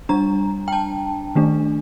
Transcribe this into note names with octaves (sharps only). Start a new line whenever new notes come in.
G3 D4 A#5
G5
A5
D#3 A3 D4